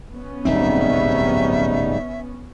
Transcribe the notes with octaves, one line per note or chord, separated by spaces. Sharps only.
B3 C#4
D1 B1 G#2 G3 C4 D#4 E5